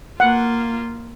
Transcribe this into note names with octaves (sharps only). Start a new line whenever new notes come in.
A#3 F4 F#5